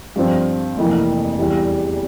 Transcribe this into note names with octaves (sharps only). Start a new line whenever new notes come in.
G2 F3 C4
F1 F2 E3 A#3
E2 E3 G3